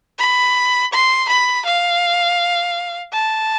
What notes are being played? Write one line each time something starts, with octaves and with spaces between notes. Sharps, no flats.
B5
C6
B5
F5
A5